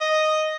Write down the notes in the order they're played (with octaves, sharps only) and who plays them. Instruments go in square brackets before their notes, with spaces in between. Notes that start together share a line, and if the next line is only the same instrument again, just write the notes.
[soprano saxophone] D#5